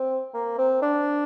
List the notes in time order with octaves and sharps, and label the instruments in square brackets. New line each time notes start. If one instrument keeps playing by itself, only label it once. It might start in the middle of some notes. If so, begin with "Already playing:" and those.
Already playing: [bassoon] C4
A#3
C4
D4